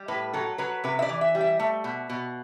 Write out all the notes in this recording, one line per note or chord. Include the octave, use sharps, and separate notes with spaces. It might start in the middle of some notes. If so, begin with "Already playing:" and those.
Already playing: G3
A2 B4
F#3 A4
F#3 B4
C3 B4
E5
D5
E3
E5
G3
E5
A3
B2
B2